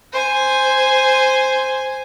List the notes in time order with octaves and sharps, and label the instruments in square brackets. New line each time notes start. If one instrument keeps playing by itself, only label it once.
[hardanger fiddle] C5 G#5